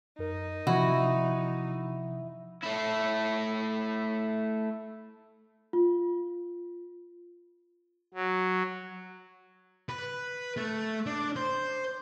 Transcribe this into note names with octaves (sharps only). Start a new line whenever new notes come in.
F#2 D#4 A#4
C3 E3 F3 E4 F#4
A3 E4
F4
F#3
B4
A3
D4
C5